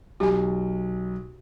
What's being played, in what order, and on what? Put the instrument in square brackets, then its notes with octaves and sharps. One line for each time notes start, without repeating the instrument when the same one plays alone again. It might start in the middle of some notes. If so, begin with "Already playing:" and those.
[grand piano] B1 [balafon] G4 G#5